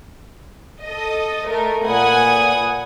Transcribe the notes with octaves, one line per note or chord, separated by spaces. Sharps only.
A4 D#5
A3 A#4
A#2 B4 F#5 G#5 D#6